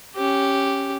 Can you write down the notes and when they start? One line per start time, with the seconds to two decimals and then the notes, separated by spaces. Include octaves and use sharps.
0.16 C#4 G4